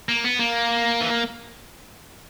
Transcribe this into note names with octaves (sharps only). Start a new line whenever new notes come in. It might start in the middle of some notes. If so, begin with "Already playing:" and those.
A#3
B3
A#3
E3